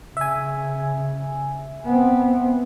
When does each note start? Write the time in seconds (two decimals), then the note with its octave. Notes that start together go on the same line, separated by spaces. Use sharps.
0.17 C#3 E5 G#5
1.85 B3 C4